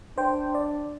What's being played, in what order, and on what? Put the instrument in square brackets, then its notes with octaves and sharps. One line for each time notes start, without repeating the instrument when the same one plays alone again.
[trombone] D4 [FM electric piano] C5 G5
[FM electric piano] D5